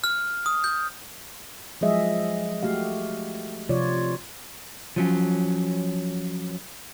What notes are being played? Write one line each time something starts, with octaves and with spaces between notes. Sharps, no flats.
F6
D#6
G6
F3 F#3 G#3 G#4 D#5 E5
A3 F#4 G4 F5
C3 F3 F4 C#5 D5
F3 F#3 C#4